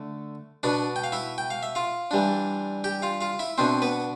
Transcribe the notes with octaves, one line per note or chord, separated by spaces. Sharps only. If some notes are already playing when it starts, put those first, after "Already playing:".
Already playing: D3 A3
B2 B3 D4 D5
G5
F5
E4 E5
G5
F5
E5
F4 F5
E3 G3 D4
G4 G5
F4 F5
F4 F5
E4 E5
B2 B3 C4 D4 C5
B3 B4